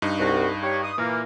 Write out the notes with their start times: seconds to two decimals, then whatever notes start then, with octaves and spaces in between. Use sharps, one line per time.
0.02 G2 D#4
0.19 C2 F#4
0.63 G4 C#5
0.83 D#6
0.98 A#2 E3 A#3